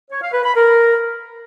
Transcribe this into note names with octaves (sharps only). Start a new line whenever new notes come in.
C#5
F5
B4
B5
A#4